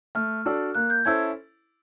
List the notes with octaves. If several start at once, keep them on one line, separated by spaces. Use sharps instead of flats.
A3 F6
D4 F#4 A4 D5
A#3 F#6
G6
C#4 E4 A4 C5 G#6